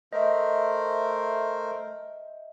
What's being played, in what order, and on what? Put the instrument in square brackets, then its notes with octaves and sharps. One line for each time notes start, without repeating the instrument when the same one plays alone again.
[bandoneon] A3 A#4 C5 [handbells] D#5 E5